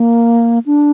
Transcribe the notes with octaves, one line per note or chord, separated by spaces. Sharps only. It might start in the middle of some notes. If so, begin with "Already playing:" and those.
Already playing: A#3
D4